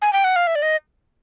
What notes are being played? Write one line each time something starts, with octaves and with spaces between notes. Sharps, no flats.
G#5
G5
F#5
F5
E5
D5
D#5